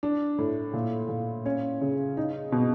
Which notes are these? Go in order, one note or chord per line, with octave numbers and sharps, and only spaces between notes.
D4
A2
A#2
A#2
C#4
C#3
D#4
B2